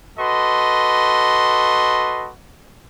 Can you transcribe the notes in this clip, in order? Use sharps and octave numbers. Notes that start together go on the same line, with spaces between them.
F#4 A4 B4 D#5 C6